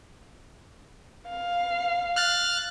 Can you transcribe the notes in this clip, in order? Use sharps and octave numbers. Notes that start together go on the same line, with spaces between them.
F5
F6 F#6 A6